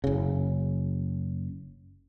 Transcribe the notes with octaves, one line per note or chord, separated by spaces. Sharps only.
F#1 C#3